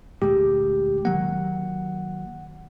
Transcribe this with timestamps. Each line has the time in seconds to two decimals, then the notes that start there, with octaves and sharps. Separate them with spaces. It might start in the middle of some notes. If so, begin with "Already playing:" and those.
0.22 D2 A#2 G#3 G4
1.05 D#3 F#3 A#3 F#5